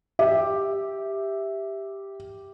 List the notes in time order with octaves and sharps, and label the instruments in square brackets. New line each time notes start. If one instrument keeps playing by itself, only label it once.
[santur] G4 [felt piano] E5